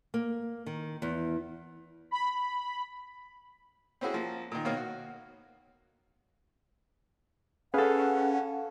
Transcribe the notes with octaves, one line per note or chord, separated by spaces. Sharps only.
A#3
D#3
E2
B5
C4 C#4 E4 F#4 G#4
F3 A#3
A#2 D#3
B2 D#3 A#3 C#5 F5
F#4
C#4 G#4 A4 B4 F5 F#5